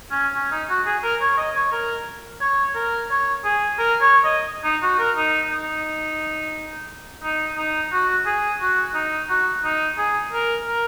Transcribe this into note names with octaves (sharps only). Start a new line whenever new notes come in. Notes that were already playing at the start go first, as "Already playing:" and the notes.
C#4
C#4
D#4
F#4
G#4
A#4
C#5
D#5
C#5
A#4
C#5
A#4
C#5
G#4
A#4
C#5
D#5
D#4
F#4
A#4
D#4
D#4
D#4
D#4
F#4
G#4
F#4
D#4
F#4
D#4
G#4
A#4
A#4